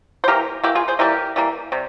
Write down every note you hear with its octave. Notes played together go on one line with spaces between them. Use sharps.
C5
E3 A#3 G4 A#4
E3 A#3 E4 G4
F4 G#4
G#4 C5
E3 G3 A#3 G4 A#4
E3 G3 A#3
C3 G3